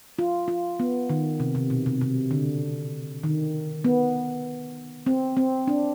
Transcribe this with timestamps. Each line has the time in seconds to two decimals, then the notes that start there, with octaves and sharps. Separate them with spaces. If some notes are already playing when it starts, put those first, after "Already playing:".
0.19 F4
0.48 F4
0.80 B3
1.10 D#3
1.40 C3
1.55 C3
1.70 B2
1.86 C3
2.01 C3
2.31 D3
3.23 D#3
3.84 B3
5.06 C4
5.37 C4
5.67 D4